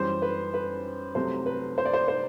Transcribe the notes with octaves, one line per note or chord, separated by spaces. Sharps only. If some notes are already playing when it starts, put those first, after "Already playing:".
Already playing: F#2 E3 G3 C5
B4
B4
C2 C3 F#3 A3 C5
B4
C5
D5
C5
C5